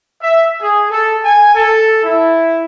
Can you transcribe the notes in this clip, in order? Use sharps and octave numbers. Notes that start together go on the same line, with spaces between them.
E5
G#4
A4
G#5
A4
E4